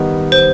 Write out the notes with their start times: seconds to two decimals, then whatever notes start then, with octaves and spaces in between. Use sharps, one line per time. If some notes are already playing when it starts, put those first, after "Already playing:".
Already playing: D#3 G3 B3
0.32 C5